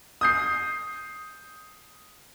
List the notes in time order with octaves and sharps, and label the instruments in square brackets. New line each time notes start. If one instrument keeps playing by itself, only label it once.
[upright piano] D#6 G6 C7